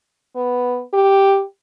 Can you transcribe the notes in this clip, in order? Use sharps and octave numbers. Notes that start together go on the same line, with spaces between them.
B3
G4